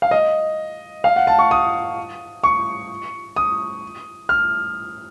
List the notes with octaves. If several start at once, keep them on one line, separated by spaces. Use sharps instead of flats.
F5
D#5
F5
F#5
A5
C#6
D#6
C#6
D#6
F6